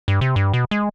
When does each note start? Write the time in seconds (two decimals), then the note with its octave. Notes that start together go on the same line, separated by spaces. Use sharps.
0.08 G2
0.21 C3
0.36 G2
0.53 B2
0.71 G#3